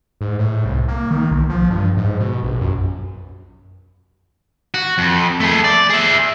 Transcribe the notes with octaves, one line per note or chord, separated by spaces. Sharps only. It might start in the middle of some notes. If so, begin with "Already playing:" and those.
G#2
A2
C2
A#3
D#3
B1
F3
G2
G#2
B2
A#1
F#2
F#4
F2
A3 G#4
D5
G#4 E5